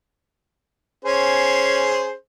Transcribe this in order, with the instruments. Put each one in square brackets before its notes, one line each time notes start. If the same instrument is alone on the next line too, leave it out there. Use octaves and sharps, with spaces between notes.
[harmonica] C#4 G#4 C5